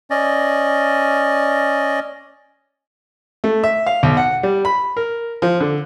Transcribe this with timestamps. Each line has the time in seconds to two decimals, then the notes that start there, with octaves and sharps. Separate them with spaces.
0.10 C#4 D5 D#5
3.44 A3
3.64 E5
3.87 F5
4.03 B1
4.17 F#5
4.43 G3
4.65 B5
4.97 A#4
5.42 F3
5.61 D3